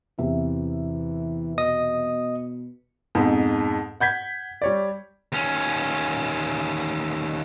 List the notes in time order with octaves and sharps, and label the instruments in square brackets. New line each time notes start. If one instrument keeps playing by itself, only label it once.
[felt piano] E2 C3 E5 [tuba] E3
[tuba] B2 [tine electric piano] D#5 D#6
[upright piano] F2 G#2 B2
F#5 G6 G#6 B6
G3 C#5 D5
[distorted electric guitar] D#2 C#4